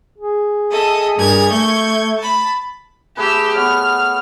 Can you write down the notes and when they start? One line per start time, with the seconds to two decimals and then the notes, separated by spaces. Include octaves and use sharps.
0.18 G#4
0.71 A4 D#5 E5
1.17 G2 A#4 G#6
1.51 A3 C#6 G6 G#6
2.18 A5 B5
3.17 A3 G4 G#4 B4 E6
3.55 B3 C#5 F6